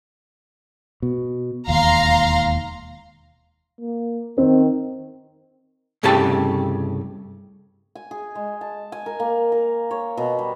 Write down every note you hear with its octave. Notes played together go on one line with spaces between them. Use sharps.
B2
E1 D#2 F5 A#5 C6
A#3
D#3 C4
C2 G2 C#3 A3 G4 A5
G#5
G#4
G#3
A5
G#5
A#4
A#3
A#4
C#5
B2
G3